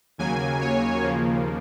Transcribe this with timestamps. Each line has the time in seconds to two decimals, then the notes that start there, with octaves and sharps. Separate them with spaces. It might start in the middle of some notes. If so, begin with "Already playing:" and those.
0.18 D#2 C#3 F#3 A#3 G#5
0.61 C#5
1.03 D#2 C#3 F3 A#3